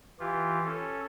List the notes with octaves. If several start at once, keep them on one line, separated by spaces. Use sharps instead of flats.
E3 F4 G4
C#4 A4